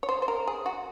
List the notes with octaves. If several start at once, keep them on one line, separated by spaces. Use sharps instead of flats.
C#5
C5
C5
A#4
G#4
F#4